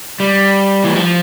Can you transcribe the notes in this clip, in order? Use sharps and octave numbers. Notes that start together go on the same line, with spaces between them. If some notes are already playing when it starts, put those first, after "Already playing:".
G3
E3
F3